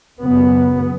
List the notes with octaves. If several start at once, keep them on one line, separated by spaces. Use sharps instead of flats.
F#2 C#3 B3